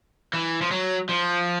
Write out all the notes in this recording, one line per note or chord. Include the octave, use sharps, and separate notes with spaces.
E3
F3
F#3
F3